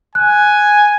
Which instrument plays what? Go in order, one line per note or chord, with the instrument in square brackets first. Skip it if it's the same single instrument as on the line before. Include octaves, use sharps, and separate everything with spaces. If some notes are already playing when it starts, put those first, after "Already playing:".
[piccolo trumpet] G#5 [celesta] F#6